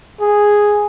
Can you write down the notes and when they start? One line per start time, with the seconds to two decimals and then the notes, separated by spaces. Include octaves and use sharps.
0.21 G#4